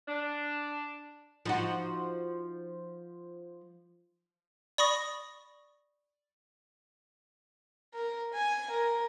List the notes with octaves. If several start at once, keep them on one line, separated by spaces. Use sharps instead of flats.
D4
F3 D#4 F#4
D5 B5 C#6 D#6 A#6
A#4
G#5
A#4